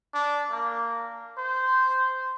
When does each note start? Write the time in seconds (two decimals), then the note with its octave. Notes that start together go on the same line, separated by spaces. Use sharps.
0.14 D4
0.50 A#3
1.37 C5